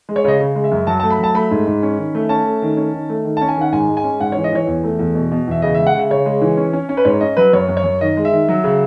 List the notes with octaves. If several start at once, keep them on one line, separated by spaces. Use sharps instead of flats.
G#3
C#5
C#3 D#5
C#3
G#3
E5
F#2
F#3 A5
A3 A5
B5
F#3 A5
A3 B5
G#2
G#2
C#4
D#3
A3
C#4 A5
A3
D#3
C#4
D#3
A3
D#3
C#4 A5
G#5
D#3 F#5
G#2 G#5
G#3
G#5
C#4
G#2 F#5
E3 C#5
D#5
E3 C#5
E2
A3
E2
B2
B2
E2 E5
C#3 D#5
G#3 E5
F#5
C#3 E5
C#3 C#5
G#3
E3
C#4
C#4
C#4
B4
G#2 C#5
C#4 D#5
F#3 B4
F#2 C#5
F#2
C#5
F#2
D#3 D#5
G#3
E5
D#3
F#3
C#3